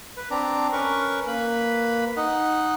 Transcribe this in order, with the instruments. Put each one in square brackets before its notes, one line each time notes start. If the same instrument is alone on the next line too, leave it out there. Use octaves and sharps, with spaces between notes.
[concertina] B4
C4 D4 D5 A#5
C#4 A#4 B4 C#6
A#3 B4 B5
D#4 D#5 F#5